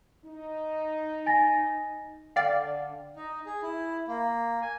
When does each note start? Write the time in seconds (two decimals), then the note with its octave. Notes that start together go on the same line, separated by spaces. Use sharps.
0.25 D#4
1.26 G#5 A6 A#6
2.36 D3 D5 F5 G5
3.16 D#4
3.46 G#4
3.62 E4
4.08 A#3
4.62 G#5